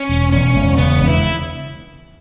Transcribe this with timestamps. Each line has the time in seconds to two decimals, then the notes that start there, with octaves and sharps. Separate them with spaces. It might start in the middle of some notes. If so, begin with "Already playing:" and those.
Already playing: C#4
0.09 E1
0.32 E1 C#4
0.56 E1
0.78 C#3 B3
1.00 E1
1.08 E4